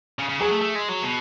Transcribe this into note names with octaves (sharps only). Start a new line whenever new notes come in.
C#3
C#3
F#3 G#4
A3
A3
G#3
F#3
B2